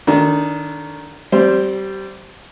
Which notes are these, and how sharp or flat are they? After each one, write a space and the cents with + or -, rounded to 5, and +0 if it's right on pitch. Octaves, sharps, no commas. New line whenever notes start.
D#3 +0 D4 -25 A4 +10
G3 -20 C4 +0 C5 +0